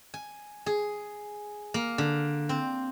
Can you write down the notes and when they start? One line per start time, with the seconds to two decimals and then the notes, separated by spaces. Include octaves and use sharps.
0.14 G#5
0.66 G#4
1.74 A#3
1.98 D3
2.49 C4